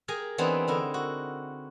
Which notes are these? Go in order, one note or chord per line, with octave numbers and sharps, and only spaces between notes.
G4 G#4 A#4 G#5 A#5
E3 B3 C4 D4 D#4
D3 D#4 E4 A#4
F#4